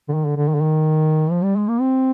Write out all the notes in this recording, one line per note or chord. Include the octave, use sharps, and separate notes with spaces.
D3
D#3
D3
D3
D#3
D3
D#3
F3
G3
G#3
A#3
C4